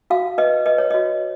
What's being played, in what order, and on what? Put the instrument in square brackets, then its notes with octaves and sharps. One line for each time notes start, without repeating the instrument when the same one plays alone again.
[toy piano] F#4 F5
B4 D#5
B4 D#5
C#5
F#4 D#5